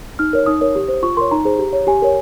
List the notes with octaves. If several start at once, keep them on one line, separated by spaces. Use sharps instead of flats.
D#4 F6
A#4 C#5
D#4 D#6
A#4 C#5
G4
C5
F4 C#6
A#4 C#5 C6
D#4 A#5
G#4 C5
G4
C#5
G4 G#5
A#4 C#5